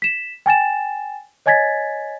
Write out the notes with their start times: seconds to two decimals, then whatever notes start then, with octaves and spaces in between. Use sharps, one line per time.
0.02 B6 E7
0.46 G5 G#5 A6 E7
1.46 C#5 D#5 G#5 G#6 A6 B6